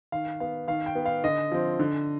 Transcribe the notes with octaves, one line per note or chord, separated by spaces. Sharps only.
D#3 F5
B3 F5
D#3 F5
G5
B3
F5
D3 D#5
F3 C4
D3